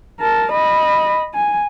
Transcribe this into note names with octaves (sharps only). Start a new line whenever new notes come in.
A#4 A5
D#5 B5
G#5